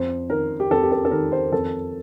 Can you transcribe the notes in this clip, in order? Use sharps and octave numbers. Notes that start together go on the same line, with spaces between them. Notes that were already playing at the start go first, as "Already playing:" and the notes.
Already playing: F2 C5
D#3 A#4
G4
F2 A4
G4
A4
A4
D#3 A#4
C5
F2 A4